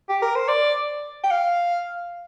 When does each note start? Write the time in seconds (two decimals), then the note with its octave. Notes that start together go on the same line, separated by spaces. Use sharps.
0.09 G4
0.22 A#4
0.35 C5
0.48 D5
1.24 G5
1.31 F5